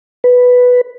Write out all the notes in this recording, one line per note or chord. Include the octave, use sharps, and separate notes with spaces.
B4